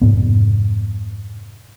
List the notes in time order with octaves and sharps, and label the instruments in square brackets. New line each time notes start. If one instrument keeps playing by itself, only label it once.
[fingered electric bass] F1 G#2 B3